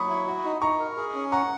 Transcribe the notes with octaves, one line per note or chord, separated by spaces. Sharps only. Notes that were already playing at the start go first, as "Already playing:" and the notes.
Already playing: F#3 B5 C#6 D#6
E4
F#4
D#4
D#4 A#5 C#6
A#4
G#4
C#4
F#5 A#5 C#6